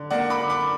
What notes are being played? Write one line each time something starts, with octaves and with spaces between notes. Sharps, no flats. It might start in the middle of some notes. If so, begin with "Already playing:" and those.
Already playing: D3
A#3 D5 F#5
B5 D6
D3
B5 D6